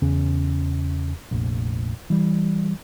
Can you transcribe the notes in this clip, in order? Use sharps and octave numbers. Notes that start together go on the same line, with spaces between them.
E2 C#3 C#4
F1 A#1
E3 G3